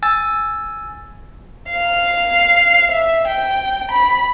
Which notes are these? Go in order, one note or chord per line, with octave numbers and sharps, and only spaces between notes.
G#5 E6 A6
F5
E5
G5
B5